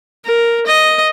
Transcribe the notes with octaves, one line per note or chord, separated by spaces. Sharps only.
A#4
D#5